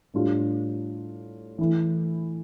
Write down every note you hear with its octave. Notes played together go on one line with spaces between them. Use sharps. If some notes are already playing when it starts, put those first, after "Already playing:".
A2 G3 D4 F4
E3 A3 E4